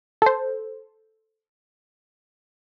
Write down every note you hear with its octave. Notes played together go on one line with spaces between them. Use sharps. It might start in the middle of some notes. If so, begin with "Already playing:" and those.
A4 C5